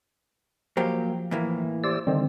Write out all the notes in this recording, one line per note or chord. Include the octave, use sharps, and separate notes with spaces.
F3 F#3 A#3 G4
A2 E3 A#3
G4 C5 D5 E6
D3 D#3 G3 C4